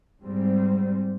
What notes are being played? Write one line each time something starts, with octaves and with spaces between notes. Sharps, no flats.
G#2 G3 C4